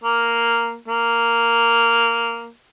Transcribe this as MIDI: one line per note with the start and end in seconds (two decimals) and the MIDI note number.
0.04 0.75 58
0.88 2.48 58